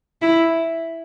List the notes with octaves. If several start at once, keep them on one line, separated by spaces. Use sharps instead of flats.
E4